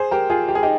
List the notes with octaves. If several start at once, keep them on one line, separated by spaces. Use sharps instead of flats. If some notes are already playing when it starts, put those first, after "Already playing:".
Already playing: G#4 C5
G4 A#4
F4 G#4
G4
G#4
D#4 G4